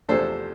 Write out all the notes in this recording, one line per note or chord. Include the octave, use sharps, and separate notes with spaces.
E2 C3 F3 A3 D4 A4 C5